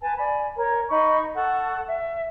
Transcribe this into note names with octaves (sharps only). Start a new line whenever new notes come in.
B4 G#5 A5
D5 G#5 B5
A#4 C#5
D#4 B5 C#6
A4 F#5 A5 C#6
E5